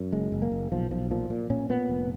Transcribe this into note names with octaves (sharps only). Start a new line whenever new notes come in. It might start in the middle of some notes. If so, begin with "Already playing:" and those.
Already playing: F#2
F#1 G#3
F#1
A#3
F#1
B1 F3
B1 F3
A#2 F3
A#2
A#2 C#4
A#2 B3
F1